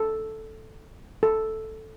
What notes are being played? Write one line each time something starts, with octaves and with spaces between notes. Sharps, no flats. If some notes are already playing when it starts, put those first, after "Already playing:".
Already playing: A4
A4